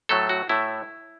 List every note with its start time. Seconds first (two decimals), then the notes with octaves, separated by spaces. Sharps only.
0.09 A2 F#3 A3 A4
0.29 F#4
0.49 A2 A3 E4